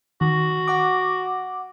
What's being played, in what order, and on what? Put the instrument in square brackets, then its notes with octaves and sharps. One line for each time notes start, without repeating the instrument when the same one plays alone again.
[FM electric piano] D#3 [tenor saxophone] F#4
[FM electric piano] F#5 D6